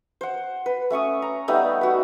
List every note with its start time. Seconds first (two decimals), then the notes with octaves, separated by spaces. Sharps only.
0.21 C5 F#5
0.66 B4
0.90 A3 C#4 C#6 D#6
1.22 A#5
1.48 G3 A3 B3 D#4
1.81 F#4 B4